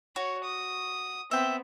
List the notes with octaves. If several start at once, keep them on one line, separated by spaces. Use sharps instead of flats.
F#4 C#5
D#6
B3 C4 E5 G5